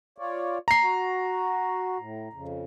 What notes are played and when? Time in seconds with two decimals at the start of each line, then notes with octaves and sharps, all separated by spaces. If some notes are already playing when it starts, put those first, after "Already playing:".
0.18 F4 C#5 D5
0.68 A#5 C7
0.82 F#4
1.98 A2
2.33 F2 C#3